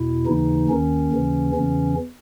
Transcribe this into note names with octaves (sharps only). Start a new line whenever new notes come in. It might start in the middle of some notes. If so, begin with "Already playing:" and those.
Already playing: E2 B2 E4
D#2 C#3 E3 D#4
D#2 D#3 C#4
D#2 C#3 E3
E2 C#3 E3 C#4